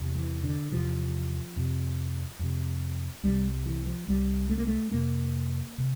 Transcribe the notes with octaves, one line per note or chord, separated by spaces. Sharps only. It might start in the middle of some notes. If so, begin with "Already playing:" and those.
Already playing: E2 C3
E3
D3
E2 C3 F3
F2 C3
F2 C3
C2 C3 G3
E3
F3
C2 C3 G3
A3
A#3
A3
F2 C3 A#3
C3